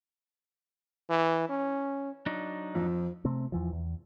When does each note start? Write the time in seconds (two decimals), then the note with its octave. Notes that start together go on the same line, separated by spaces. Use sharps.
1.10 E3
1.49 C#4
2.26 F#3 D4 D#4
2.75 F2 F3
3.25 C3 A3 C4
3.52 E2 E3 F3
3.72 E2